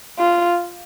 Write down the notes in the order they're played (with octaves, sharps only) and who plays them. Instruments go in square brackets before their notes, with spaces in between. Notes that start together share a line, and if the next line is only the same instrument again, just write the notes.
[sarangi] F4